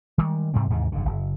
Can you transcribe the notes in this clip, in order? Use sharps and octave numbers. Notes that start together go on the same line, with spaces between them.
D#3 G3 G#3
G#2 C3 G3 C4
D#2 G#2 C3 E3
F1 G2 D3
F#1